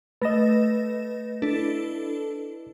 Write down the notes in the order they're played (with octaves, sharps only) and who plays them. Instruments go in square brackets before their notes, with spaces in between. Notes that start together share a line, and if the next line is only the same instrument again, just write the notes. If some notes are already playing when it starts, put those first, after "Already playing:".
[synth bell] A3 A#6 E7 [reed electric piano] B4 D#5
[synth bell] D4 E4 A4